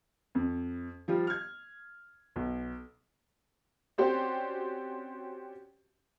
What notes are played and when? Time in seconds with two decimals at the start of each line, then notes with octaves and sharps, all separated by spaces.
0.35 F2
1.08 F3 G3 F4
1.27 F6 G#6
2.36 B1
3.98 C4 C#4 F#4 G4 C5 D5